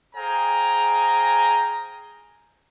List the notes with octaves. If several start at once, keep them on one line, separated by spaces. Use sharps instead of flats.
G#4 C5 F5 G5 G#5 A#5